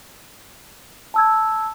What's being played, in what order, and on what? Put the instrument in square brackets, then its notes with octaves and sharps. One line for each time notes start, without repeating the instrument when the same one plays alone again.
[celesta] A5 E6 G#6